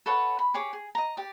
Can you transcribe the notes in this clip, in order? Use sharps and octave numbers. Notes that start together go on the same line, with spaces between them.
A4 B4 C#5 F#5
B5
G4 G#4 C#5 D6
G#4
D#5 A#5
G4 D5